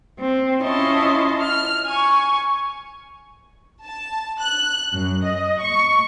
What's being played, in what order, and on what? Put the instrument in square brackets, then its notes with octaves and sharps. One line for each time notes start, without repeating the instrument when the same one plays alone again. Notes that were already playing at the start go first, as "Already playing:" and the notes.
[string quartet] C4
C#4 E4 F4 D#5 A5 C6
F6
G#5 C#6
[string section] A5
F#6
F#2
D#5
C#6